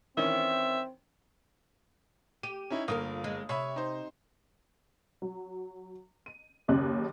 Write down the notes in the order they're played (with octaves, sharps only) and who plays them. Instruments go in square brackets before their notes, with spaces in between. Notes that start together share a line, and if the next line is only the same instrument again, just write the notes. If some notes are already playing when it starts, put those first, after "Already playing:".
[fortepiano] D#3 E3 C#4 [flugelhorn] C4 [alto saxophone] E5
[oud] G4 [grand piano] D#7
[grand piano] C#4 D#4 E4
[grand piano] G1 A#3 D#6 [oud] F4 F#4 A#4
[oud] G#3
[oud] C3 [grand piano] C#5 E5 B5
[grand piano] D#4 C5
[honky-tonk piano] F#3
D#7
F#1 D#2 C#3 F#6